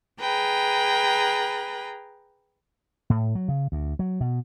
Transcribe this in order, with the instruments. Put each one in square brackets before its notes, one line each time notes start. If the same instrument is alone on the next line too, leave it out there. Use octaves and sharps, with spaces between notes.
[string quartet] G#4 B4 G5 A#5
[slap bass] A2
F#3
C#3
D2
F#3
B2